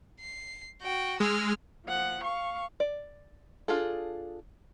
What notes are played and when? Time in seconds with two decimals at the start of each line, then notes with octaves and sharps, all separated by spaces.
0.20 C7
0.82 F#4 G5
1.20 G#3 E6 F6
1.85 F3 F#5
2.21 F5 C#6
2.80 D5
3.68 D4 F4 G#4 A4